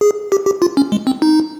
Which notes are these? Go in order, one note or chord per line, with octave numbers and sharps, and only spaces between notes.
G#4
G4
G4
F4
C#4
G#3
C4
D#4